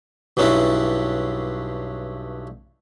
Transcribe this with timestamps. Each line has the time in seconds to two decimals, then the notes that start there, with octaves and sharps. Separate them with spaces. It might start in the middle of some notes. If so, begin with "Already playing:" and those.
0.37 B1 G2 C#4 D4 E4